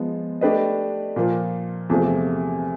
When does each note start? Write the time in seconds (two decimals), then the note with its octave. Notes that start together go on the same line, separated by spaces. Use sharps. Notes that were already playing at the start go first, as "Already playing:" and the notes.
Already playing: F3 G#3 B3
0.41 A3 D4 G4 B4 D#5
1.16 A#2 F3 A#3
1.90 E2 C3 F3 A3